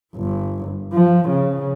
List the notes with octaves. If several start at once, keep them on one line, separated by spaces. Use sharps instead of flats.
G1
F3
C#3